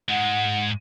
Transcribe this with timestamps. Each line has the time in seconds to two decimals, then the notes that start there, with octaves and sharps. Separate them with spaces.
0.09 G#2 G#3 F#5